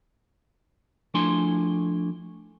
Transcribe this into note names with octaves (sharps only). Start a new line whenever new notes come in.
F3 A3 D4 E4 G#5 C6